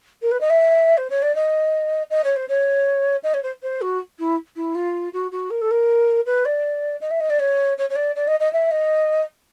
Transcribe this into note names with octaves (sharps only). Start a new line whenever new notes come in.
A#4
B4
D#5
E5
C5
C#5
D5
D#5
D#5
C#5
C5
C#5
D#5
C#5
C5
C5
F#4
E4
E4
F4
F#4
F#4
A#4
A4
A#4
B4
D5
D#5
E5
D#5
D5
C#5
C#5
C#5
D5
D5
D#5
D#5
E5
D#5